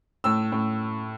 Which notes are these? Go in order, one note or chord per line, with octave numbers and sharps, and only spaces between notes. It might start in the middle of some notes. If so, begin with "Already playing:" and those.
A2 E6
A2